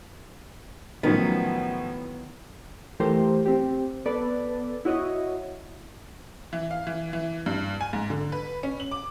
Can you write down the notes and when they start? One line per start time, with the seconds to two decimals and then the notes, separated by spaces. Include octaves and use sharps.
1.03 A2 D#3 F3 F#3 B3 C#4 A#4
3.00 E3 A3 G4 A#4 C5
3.45 C4 G4
4.06 B3 A4 B4 D5
4.85 E4 F#4 C#5 D#5
6.53 E3
6.71 F5
6.87 E3
7.13 E3
7.46 G2
7.81 G#5
7.93 G#2
8.10 D3
8.32 B4
8.63 C#4
8.80 F#7
8.91 D6